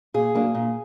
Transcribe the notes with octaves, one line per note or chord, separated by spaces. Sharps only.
A#2 G#4
F#3 A#3 D4
A#2